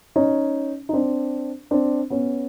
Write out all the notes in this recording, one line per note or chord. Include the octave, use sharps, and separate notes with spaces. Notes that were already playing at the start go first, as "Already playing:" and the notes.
C#4 D#4
D#4
C4 D4
C4 D4
B3 C#4